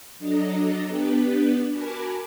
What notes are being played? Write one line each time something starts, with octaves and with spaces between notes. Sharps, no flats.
F#3 D4 A4 D#5 A#5
B3 D4 G4 B4
F#4 A#4 G#5 A5 B5 D6